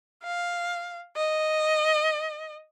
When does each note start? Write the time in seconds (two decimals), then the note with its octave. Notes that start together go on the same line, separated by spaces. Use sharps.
0.24 F5
1.16 D#5